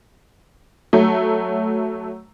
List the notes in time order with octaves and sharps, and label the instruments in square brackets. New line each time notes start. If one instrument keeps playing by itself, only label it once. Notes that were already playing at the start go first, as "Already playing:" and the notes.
[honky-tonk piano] F#3 A3